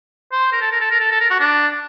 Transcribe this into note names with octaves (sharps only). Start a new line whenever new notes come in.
C5
A#4
A4
A#4
A4
A#4
A4
A4
A#4
F#4
D4